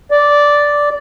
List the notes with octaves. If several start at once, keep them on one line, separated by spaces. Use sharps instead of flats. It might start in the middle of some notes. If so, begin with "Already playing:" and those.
D5